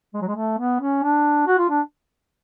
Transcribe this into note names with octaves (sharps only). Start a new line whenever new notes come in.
G#3
F#3
G#3
A3
B3
C#4
D4
F#4
F4
D4